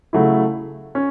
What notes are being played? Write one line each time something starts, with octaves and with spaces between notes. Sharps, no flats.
C#3 F#3 A3 E4
C#4